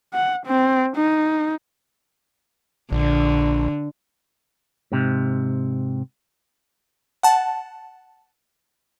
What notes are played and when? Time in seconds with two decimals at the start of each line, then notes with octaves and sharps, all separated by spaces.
0.14 F#5
0.46 C4
0.97 D#4
2.92 A#1 D3
4.92 G#2 C3
7.23 F#5 A5